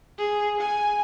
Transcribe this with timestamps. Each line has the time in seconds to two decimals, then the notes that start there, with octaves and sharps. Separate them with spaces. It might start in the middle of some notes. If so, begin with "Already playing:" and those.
0.18 G#4
0.60 G#5